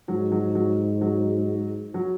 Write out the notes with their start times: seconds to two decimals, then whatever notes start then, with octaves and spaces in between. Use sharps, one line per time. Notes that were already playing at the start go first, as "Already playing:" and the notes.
0.08 G#2 F#3
0.32 F#3
0.55 F#3
1.01 F#3
1.94 F#3